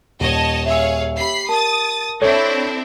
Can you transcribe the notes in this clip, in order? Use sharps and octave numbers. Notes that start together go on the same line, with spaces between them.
D#1 C#5 D#5 A5
G#4 C#5 E5 F5 E6
G4 B5 C7
A#4 A5 D#6 A6
C4 D4 E4 A4 C#5 E5